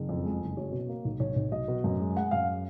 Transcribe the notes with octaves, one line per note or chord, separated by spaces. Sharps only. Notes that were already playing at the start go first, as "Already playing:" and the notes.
Already playing: F#1
F2
G#3
F#1
F#3 C#5
B2
A#3
B1
B1 C#5
B1
F#3 D#5
B2
F#2
G#3
G#3 F#5
F#2 F5